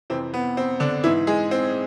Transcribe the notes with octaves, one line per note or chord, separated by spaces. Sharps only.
F2 C3 E3 C4
B3
C4
D3 D4
G#2 E3 E4
G#3 G#4
C4